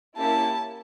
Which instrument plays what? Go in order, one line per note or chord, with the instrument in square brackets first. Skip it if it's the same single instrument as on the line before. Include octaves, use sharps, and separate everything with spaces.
[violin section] A#3 C#4 E4 G4 [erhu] A5